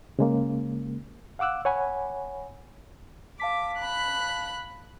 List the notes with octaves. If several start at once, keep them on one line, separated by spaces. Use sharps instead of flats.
C#3 G#3 A#3
F5 F#5 D6 E6 F#6
C#5 F#5 G#5 B5
F5 A5 D6 B6
B5 F#6